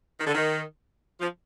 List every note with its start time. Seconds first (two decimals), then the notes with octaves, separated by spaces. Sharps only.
0.19 D#3
0.26 D3
0.34 D#3
1.20 F3